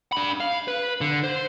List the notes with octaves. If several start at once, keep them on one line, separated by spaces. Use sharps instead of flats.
D4 B5
F5
B4
D3
C5